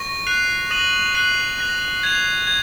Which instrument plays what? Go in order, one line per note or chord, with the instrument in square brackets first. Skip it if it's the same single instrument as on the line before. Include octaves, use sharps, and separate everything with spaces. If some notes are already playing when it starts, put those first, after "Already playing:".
Already playing: [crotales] C#6 A#6
F#6 C7 F7
D#6 A#6 D#7 F#7
F#6 C7 F#7
F#6 A#6 F7
G#6 C7 F7
G#6